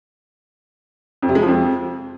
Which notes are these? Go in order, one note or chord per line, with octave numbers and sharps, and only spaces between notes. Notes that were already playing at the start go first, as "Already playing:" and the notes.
F2
C3
G#3
F3
F2